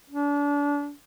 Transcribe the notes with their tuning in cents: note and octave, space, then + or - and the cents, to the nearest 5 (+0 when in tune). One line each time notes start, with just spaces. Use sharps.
D4 -30